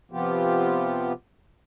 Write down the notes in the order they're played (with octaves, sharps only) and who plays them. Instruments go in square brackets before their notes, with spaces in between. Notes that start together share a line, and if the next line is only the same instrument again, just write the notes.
[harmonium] C3 F3 B3 F4 G4